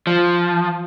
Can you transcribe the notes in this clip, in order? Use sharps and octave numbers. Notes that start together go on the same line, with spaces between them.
F3